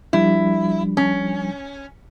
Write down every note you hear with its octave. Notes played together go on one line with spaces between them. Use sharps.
F3 G3 D4 E4
C#4